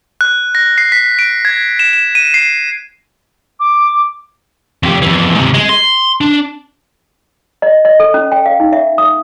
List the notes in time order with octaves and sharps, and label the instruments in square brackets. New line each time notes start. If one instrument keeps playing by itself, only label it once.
[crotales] F#6
A#6
C7
B6
D7
G#6
E7
E7
D#7
C7
[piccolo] D6
[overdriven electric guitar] F2 G4
F2 E3
G#2 C3
G#3
C6
D4
[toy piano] D#5
D#5
A4
C#4
G5
F5
D#4
E5
D#6